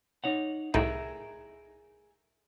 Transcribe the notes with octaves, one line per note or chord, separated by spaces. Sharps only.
D#4 C#5 F#5
C2 A2 D#4 G#4 A#4 E5